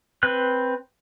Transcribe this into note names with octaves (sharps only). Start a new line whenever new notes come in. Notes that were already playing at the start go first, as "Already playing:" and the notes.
C4 B4 F#6